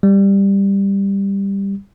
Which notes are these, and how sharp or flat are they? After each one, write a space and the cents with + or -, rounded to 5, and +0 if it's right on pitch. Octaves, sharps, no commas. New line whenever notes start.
G3 +10